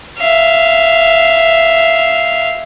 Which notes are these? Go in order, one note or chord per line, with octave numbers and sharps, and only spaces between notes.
E5 F5